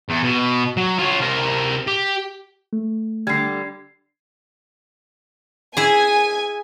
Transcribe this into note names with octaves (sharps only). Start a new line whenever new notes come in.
E2
B2
F#3
F4 C#5
C3 A#4
G4
A3
D3 G3 G#6 C7
E4 G#4 G#5